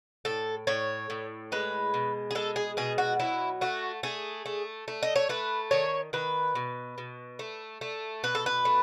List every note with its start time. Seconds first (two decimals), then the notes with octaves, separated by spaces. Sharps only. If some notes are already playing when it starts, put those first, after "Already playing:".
0.25 A2 A4
0.67 A2 C#5
1.10 A2
1.52 G#3 B4
1.94 B2
2.31 G#4
2.35 G#3 A4
2.56 G#4
2.77 B2 G#4
2.98 F#4
3.20 F#3 E4
3.61 A3 F#4
4.03 A3 G#4
4.46 A3
4.88 A3
5.03 D#5
5.16 C#5
5.29 A3 B4
5.71 D#3 C#5
6.13 D#3 B4
6.55 B2
6.98 B2
7.39 A3
7.81 A3
8.23 B2 B4
8.35 A4
8.46 B4
8.65 A3